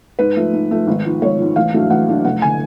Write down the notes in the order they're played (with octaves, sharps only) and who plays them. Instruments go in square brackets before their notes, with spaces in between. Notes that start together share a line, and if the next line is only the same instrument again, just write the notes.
[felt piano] G#2 B4
F3 A3
G#2
F3 A3
G#1
G#2 F3
G#1 C#5
G#2 F3
A1 F5
A2 F#3 A3 D4
A1 F#5
A2 F#3 A3 D4
F1 F#5
D3 G#5